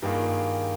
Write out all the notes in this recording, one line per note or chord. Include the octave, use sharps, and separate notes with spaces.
G2 D#3 A#3 F4 G#4